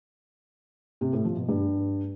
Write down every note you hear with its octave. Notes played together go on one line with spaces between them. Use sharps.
C3
A2
F3
B2
G2